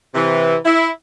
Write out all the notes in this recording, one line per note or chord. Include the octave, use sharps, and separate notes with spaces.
C3 E3
E4